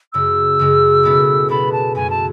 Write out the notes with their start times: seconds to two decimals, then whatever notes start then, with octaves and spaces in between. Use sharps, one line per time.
0.13 F#2 C#3 G#3 E6
0.59 F#2 C#3 G#3
1.03 B2 G#3 B3 E4 A4
1.48 B2 G#3 B3 E4 A4 B5
1.72 A5
1.95 F#2 C#3 F#3 A3 G#5
2.10 A5